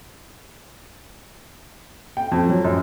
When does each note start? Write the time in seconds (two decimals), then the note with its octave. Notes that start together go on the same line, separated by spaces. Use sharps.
2.17 G5
2.32 F2
2.49 F#3
2.64 F#2